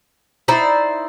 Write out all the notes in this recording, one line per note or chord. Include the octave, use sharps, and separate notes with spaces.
D#4 E4 C5 D5